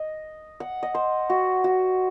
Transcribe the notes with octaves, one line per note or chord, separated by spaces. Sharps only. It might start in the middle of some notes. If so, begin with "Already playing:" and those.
Already playing: D#5
F#5
D#5
C5
F#4
F#4